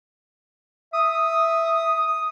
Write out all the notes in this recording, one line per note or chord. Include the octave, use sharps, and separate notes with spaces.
E5 D#6